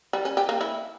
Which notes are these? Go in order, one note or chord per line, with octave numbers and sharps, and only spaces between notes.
G3
C#4
G4
A#3
E4